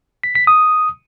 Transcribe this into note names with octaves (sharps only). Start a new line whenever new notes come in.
B6
B6
D#6